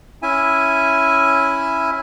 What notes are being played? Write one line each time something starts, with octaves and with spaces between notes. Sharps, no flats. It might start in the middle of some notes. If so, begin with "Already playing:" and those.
C#4 E4 E5 G#5